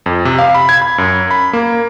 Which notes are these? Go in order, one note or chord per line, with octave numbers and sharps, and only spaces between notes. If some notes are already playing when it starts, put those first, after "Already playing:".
F2
C3
F5
B5
G#6
B5
F#2
B5
A#3